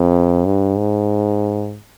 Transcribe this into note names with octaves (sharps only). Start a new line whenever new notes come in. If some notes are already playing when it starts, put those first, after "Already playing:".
Already playing: F2
G2
G#2